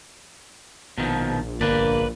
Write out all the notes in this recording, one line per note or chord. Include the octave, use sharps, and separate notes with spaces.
A#1 B2 D#3 F3
G1 D3 A#3 B4 D5